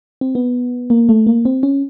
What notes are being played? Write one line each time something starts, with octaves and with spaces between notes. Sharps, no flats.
C4
B3
A#3
A3
A#3
C4
C#4